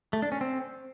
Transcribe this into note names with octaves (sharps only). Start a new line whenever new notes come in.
A3
D4
C#4
C4